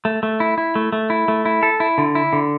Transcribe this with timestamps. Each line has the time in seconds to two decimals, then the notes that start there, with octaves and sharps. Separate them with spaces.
0.05 A3
0.23 A3
0.40 E4
0.58 E4
0.75 A3
0.93 A3
1.10 E4
1.28 A3
1.45 E4
1.63 A4
1.80 E4
1.98 D3
2.15 E4
2.33 D3